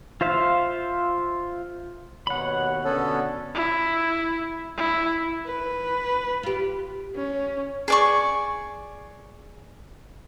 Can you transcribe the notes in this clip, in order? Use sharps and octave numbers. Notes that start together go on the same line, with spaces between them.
F4 C5 E5 F5
D#2 B2 C#5 F#5 B5
B2 D3 B3 C#4 A4
E4
E4
B4
F4 G4
C#4
G#4 D5 C#6